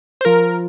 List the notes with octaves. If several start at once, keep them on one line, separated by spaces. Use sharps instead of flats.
C5
F3 F4 A#4